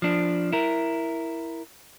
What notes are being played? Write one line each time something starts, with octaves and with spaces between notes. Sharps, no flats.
F3 D4
E4 A#4